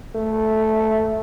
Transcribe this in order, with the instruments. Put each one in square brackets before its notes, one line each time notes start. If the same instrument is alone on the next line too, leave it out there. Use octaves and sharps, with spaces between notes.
[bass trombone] A3